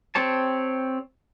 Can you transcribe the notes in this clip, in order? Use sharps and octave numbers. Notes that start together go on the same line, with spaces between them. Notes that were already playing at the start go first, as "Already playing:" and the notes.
C4 G4 C#5 A5